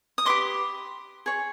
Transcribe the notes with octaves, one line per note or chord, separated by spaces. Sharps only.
D#6
G4 B4 D#5 C6 D6
G#4 C#5